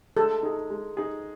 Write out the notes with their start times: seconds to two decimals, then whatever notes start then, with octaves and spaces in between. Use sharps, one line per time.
0.17 G#3 A4
0.43 D#4 G#4
0.70 G#3
0.97 D#4 G#4